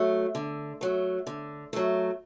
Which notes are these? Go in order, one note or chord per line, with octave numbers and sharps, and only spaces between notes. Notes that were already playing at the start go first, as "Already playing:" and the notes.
Already playing: F#3 A3
D3
F#3 A3
D3
F#3 A3